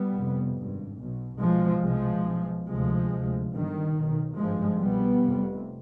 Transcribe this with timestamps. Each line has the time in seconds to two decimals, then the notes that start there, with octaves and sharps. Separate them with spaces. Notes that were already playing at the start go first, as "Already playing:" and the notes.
Already playing: G3 B3
0.14 F1 F2 C3
0.58 G#1 G2
0.99 B1 B2
1.41 B1 B2 F3 G#3
1.84 C2 B2 F3 G#3
2.26 B1 B2
2.68 D2 C3 F3 G#3
3.10 D2 C3
3.52 G1 G2 D#3
3.96 B1 B2
4.37 G#1 G2 F3 G#3
4.79 C2 B2 G3 B3
5.21 F1 F2 C3